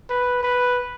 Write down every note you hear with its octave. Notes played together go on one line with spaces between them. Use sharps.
B4
B4